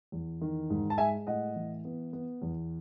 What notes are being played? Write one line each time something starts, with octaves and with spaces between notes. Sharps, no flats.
E2
D#3
G#2
A5
G#3 E5 G#5
A2 D#5 F#5
E3
B3
B3
E2